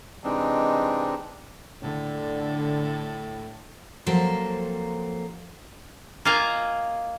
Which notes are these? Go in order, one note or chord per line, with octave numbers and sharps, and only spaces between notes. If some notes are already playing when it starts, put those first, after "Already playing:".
C3 E3 G#3 C4 D4 D#4
A2 D3
F3 F#3 A#3 C4 A4 C5
A#3 F4 D#5 F5 G#5 A#5